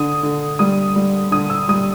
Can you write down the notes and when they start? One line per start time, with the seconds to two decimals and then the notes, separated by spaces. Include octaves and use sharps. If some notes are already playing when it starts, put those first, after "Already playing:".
Already playing: D3 D#6
0.23 D3
0.59 G3 D#6
0.96 G3
1.31 D3 D#6
1.50 E6
1.68 G3 D#6